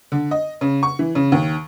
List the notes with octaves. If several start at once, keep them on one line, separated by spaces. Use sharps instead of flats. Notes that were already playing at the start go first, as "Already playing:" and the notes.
D3
D#5
C#3
C#6
E3
C#3
D#2